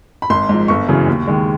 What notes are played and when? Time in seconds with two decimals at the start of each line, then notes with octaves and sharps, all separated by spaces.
0.22 B5
0.30 G#1 C6
0.49 G#2
0.54 F3
0.68 G1 C#6
0.88 F#2 C#3 E3
1.07 D#2
1.27 D#3 G#3